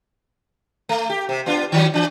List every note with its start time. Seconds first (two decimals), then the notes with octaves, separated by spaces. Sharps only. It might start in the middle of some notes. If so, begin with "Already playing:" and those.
0.89 A3
1.10 G4
1.29 C3
1.46 B3 D4 F4
1.72 D#3 F#3 G3
1.94 E3 D4